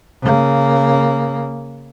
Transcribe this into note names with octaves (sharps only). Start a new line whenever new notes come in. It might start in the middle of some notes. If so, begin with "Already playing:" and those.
C#3 A#3